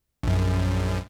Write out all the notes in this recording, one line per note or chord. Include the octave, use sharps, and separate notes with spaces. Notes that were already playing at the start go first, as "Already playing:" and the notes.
A#1 F#2